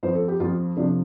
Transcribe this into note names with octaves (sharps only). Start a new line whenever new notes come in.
F2 F3 C5
A4
G4
F2 F3 F4
F2 C3 F3 D4